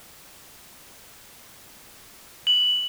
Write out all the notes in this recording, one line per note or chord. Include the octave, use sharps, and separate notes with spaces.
F#7